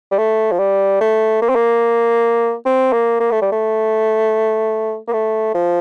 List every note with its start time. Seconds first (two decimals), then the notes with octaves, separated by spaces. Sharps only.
0.11 G3
0.18 A3
0.52 F3
0.59 G3
1.01 A3
1.42 A#3
1.49 C4
1.55 A#3
2.66 C4
2.93 A#3
3.20 A#3
3.31 A3
3.42 G3
3.52 A3
5.08 A#3
5.13 A3
5.54 F3